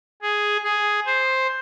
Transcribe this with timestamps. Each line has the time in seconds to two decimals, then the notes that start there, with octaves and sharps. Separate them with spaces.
0.22 G#4
0.64 G#4
1.06 C5